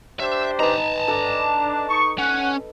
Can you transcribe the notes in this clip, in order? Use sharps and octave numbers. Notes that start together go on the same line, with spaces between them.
D4 G4 C5 E5
D#4 B4 A5 A#5
D4 A4
D#4 C#6
C#4 F#5